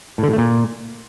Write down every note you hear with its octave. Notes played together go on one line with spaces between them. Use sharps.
A2
D3
A2
A3
A#2